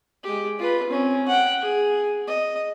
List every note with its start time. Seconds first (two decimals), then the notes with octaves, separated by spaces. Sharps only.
0.23 G#3 G4
0.59 F4 B4
0.89 C4 C#4
1.28 F#5 G5
1.61 G#4
2.27 D#5